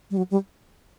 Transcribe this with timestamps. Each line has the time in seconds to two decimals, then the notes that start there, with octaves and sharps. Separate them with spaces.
0.11 G3
0.17 F#3
0.31 G3